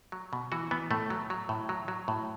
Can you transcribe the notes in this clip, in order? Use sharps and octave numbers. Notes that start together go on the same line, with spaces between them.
F#3
B2
E3 F#4
E3 B3
A2 A3
F#3
F#3
A2
F#3
F#3
A2